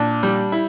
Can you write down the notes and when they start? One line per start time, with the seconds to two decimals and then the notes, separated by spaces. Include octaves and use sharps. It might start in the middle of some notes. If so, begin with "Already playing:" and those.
Already playing: A#2 D4
0.23 G3
0.52 E4